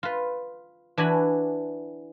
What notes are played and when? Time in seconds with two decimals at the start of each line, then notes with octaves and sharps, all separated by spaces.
0.03 F4 B4
0.97 E3 D4 F#4 G#5 B5